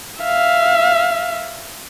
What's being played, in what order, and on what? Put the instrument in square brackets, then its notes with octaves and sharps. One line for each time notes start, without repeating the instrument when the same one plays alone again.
[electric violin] E5 F5